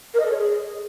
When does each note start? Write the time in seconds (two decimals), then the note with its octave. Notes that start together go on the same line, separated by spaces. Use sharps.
0.14 A#4
0.19 D#5
0.25 A4
0.31 C#5
0.37 G#4